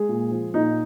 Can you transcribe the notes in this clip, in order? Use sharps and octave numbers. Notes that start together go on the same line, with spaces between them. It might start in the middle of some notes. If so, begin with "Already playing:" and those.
Already playing: G#3 G#4
A#2
F3
A#2 D#4